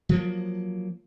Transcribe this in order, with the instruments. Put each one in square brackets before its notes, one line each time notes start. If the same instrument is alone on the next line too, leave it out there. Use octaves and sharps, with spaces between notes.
[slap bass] F3 F#3 A#3